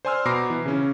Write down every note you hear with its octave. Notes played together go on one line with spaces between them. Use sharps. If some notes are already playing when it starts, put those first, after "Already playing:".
C5 D5 G#5 C6 E6 F6
B2 A#5 B5 D6 A#6 C7
E3
C#3 C#4